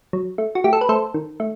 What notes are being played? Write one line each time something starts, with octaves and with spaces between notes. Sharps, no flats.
F#3
A3
F#4
A3 G4
A4
B4
A3 A4 C5
D#3
A3